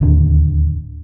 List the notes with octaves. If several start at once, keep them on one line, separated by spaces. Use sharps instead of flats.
D1 D#2 D3